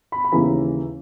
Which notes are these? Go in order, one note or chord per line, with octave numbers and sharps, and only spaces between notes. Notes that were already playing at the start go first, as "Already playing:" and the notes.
B5
B5
D#2 C#3 E3 A#5